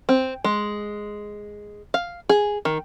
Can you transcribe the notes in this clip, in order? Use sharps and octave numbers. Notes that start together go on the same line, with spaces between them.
C4
G#3
F5
G#4
D#3